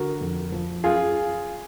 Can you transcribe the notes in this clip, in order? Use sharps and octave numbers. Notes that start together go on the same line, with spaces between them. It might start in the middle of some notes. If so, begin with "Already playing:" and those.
Already playing: D3 F#4 A#4
F2
F3
F#2 F4 G#4